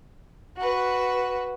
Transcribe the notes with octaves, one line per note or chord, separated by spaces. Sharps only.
F#4 B4